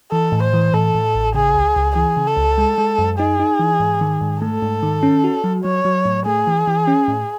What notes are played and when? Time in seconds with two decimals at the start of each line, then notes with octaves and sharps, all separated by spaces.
0.12 E3 A4
0.32 A2
0.43 C5
0.53 E3
0.74 A2 A4
0.95 A2
1.15 A1
1.35 C#3 G#4
1.55 C#2
1.76 C#2
1.96 E3 G#4
2.17 C#3
2.27 A4
2.37 C#2
2.58 G#3
2.78 G#3
2.99 F#2
3.19 D#4 G#4
3.40 D#4
3.59 E3
3.80 G#2
4.01 D#3
4.21 G#2
4.42 A3 A4
4.62 G#2
4.83 D#3
5.03 C#4
5.24 F#4
5.44 F#3
5.64 F#3 C#5
5.85 F#3
6.05 A2
6.26 A3 G#4
6.47 E3
6.67 E3
6.87 C#4
7.08 A2